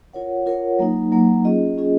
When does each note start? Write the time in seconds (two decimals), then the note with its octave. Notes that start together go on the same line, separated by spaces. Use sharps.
0.13 F4 A#4 C#5 F#5
0.46 F4 A#4 C#5 F#5
0.79 F#3 A#3 D#4
1.12 F#3 A#3 D#4
1.45 C#4 F4 G#4 D#5
1.78 C#4 F4 G#4 D#5